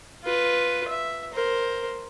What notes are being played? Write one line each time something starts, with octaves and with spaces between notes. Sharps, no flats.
F4 B4
E5
A#4 C5